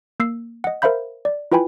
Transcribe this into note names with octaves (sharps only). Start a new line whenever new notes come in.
A#3 E6 C7
D#5 F#5
A#4 C5 E5 F5 B5 G6
D5
E4 F4 B4 G5 G#5 B5